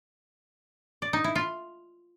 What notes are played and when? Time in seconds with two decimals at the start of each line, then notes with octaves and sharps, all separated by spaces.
1.02 D5
1.13 D#4
1.24 E4
1.35 F4